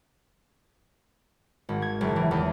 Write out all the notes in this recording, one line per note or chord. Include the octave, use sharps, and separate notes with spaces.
G#1
G#6
F#1
E3
E2